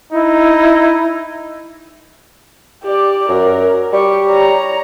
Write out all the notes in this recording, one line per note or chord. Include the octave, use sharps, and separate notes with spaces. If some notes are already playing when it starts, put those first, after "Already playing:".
D#4 E4
G4 D5
F#2 A#4
G3 G4 C#6
C#5 A#5